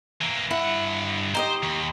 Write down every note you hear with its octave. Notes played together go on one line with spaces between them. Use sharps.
E3 A#3
G2 E4 F#5
D#4 G4 C5 D#5
D#2